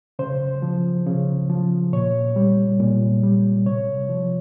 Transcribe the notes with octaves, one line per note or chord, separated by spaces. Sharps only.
C#3 C5
F3
C#3
F3
A#2 C#5
G3
A#2
G3
C3 C#5
F3